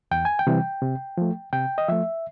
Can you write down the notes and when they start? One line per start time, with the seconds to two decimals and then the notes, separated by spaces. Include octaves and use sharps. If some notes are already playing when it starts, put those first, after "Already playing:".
0.11 E2 G5
0.25 G#5
0.39 G5
0.47 C3 E3 G3
0.82 C3
1.17 F3 A3
1.52 C3 G5
1.78 D#5
1.88 F3 A3 E5